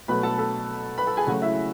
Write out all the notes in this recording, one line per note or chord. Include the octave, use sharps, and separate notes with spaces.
B2 F#3 A3 B4 B5
A4 A5
A4 A5
B4 B5
A4 A5
G#4 G#5
C#3 F#3 A3 F#4 F#5
E4 E5